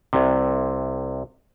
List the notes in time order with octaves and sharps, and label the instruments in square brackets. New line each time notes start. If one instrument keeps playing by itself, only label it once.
[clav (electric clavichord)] C2 C3